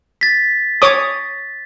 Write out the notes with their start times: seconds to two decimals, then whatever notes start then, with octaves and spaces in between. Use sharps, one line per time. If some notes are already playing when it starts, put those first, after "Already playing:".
0.21 A6 B6
0.82 C#5 D6 D#6